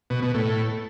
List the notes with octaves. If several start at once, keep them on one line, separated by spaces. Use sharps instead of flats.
B2
B2
A2